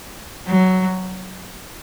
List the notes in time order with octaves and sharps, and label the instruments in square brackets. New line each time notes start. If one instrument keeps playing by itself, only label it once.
[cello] F#3